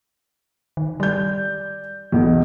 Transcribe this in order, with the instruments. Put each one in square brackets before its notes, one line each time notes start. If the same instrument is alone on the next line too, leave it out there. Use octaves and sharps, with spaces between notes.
[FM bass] D#3
[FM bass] G3 [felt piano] D5 G6
[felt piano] B1 E2